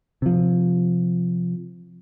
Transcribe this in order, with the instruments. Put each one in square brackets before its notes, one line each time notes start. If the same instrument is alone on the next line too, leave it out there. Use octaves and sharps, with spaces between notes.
[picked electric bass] C3 F3